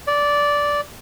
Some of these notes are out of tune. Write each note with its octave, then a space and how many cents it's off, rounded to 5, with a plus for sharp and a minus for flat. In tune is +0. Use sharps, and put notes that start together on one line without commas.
D5 -10